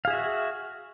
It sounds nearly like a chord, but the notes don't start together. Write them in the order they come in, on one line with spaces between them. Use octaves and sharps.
F5 G#4 E5 F#4